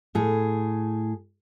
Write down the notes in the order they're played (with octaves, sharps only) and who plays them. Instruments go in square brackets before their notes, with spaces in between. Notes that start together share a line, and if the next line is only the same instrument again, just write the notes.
[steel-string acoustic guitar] A2 G#4